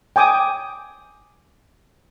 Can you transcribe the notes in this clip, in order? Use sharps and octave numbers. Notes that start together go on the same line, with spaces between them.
G5 G#5 D6 D#6